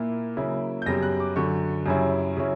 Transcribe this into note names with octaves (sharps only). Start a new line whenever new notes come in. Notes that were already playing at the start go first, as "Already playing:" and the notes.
Already playing: A#2 A#3 E4
C#3 F#3 A#3 E4
G6
F#2 C#3 G3 B3 A#6
F#6
D6
F#2 D3 F#3 C#6
F#2 C#3 G3 C#4 E4
C#3 F#3 C#4 E4